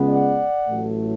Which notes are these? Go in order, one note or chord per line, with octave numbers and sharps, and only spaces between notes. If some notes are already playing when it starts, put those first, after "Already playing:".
Already playing: C#2 C#3 G#3 B3
D5 F#5
A1 A2 F#3 A3